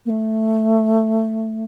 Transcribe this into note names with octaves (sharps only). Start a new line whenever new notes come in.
A#3
A3